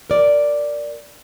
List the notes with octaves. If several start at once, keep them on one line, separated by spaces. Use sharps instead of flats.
A#4 D5